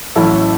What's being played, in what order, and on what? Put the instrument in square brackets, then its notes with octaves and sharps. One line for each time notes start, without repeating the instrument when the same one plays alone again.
[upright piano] A1 A2 F#3 C#4 E4 A4